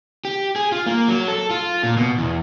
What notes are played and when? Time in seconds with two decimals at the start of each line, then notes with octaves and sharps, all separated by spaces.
0.25 G4
0.56 G#4
0.72 F4
0.86 A#3
1.08 F#3
1.28 A4
1.50 F4
1.83 A#2
1.97 B2
2.18 E2